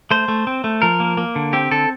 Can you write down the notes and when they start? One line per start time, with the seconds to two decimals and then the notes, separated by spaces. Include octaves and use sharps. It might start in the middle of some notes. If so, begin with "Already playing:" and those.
0.11 A3 C5
0.28 A3
0.47 C4
0.64 A3
0.82 F3 A#4
1.00 A#3
1.17 A#3
1.36 D3
1.53 C4 G4
1.71 D3 A4